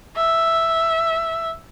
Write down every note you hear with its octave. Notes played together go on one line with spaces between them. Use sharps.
E5